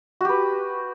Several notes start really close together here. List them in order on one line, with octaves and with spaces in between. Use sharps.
F#4 G4 B4